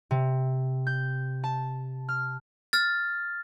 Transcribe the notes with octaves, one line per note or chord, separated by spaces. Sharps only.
C3
G6
A5
F6
F6 A6